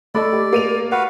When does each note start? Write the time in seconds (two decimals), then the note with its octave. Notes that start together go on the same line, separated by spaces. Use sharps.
0.15 A3 A4 D5 D#5 B5
0.33 G4
0.53 A#3 D#7 F7
0.92 F#4 B4 F5 F#5